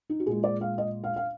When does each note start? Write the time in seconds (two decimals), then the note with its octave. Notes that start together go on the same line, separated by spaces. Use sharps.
0.10 D#4
0.20 F#4
0.26 A#2 G#3 G#4
0.44 D5
0.61 F5
0.78 D#5
1.04 F5
1.16 F5